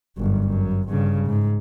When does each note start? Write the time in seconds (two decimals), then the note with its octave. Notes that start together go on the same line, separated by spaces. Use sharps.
0.17 G1 F#2
0.47 F#2
0.88 G2 C#3
1.27 G#2